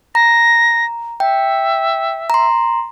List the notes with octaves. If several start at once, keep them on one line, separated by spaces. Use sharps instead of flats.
A#5 A#6
E5 G5
A#5 C6